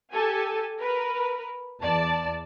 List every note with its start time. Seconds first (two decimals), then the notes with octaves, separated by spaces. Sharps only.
0.12 G4 A4 G#5
0.79 A#4 B4
1.80 E2 D5 A5